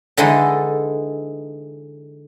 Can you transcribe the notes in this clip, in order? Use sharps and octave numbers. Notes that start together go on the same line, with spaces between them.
D3 E3 G#3 D#4 A4